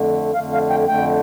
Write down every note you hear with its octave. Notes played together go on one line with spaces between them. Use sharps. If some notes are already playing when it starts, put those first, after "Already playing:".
Already playing: F2 D3 A3
F2 D3 A3 F5
F5
G5
F2 D3 A3 G5